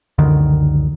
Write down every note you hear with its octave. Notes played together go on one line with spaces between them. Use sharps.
C#2 F#2 D3 D#3